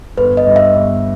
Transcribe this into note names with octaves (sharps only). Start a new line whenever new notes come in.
G1 B4
D#5
G2 G3
E5
G1